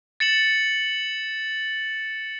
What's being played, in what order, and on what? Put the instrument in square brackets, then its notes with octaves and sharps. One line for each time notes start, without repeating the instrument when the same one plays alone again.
[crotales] A6 C#7 E7 F#7